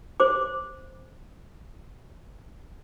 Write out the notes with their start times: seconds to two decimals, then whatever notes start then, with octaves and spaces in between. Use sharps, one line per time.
0.20 C5 D6